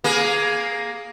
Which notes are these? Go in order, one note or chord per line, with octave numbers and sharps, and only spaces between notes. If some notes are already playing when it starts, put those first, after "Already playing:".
A#3 G#4